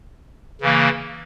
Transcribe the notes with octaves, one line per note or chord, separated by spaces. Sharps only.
C#3 E3 A#3